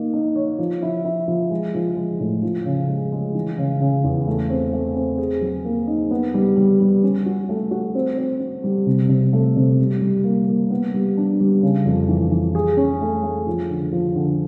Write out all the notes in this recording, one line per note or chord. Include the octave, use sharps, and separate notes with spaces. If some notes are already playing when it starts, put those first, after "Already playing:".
Already playing: A#3 D#4
D#4
C#5
F3
E4
E4
F3
G#3
F3
G#3
A2
F3
C#3
G#3
G#3
E3
C#3
C#3
E2
A3
C4
A3
C4
G#4
F#3
A#3
D#4
B3
G3
G3
G3
C#4
F#4
A3
F#4
C4
C4
C4
G3
C3
C3
A3
C3
G3
G3
A#3
A#3
B3
G3
D4
G3
C#3
F2
E3
E3
G#4
C#4
A3
A3
F3
D3
F3
D3